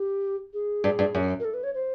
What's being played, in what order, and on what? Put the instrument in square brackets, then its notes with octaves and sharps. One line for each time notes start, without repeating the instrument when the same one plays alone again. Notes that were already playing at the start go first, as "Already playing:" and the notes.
Already playing: [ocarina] G4
G#4
[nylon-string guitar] G2
G2
F#2
[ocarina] A#4
A4
B4
C#5
C5